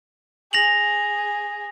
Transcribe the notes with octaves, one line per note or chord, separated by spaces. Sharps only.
G#4 A#6 F7 F#7